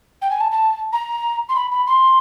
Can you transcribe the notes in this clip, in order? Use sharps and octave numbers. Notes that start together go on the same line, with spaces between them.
G5
G#5
A5
A5
A#5
C6
B5
B5
C6